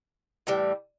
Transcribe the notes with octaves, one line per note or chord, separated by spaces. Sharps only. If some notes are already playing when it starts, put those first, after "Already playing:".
A2 E3 G3